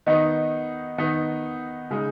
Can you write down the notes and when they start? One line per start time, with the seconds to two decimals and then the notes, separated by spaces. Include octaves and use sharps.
0.06 D#3 B3 D#4 D#5
0.98 D#3 B3 D#4
1.90 C#3 G#3 D#4